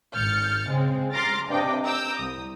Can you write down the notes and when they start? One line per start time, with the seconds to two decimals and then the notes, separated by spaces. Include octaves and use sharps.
0.13 G#1 F6 G6 A6 C#7
0.68 C#3 G#3 C4
1.12 A#5 C6 D6 F6 A6 A#6
1.50 G2 C3 D4 D#5 G5 D6
1.83 A#5 D6 E6 G6
2.18 C2 D#6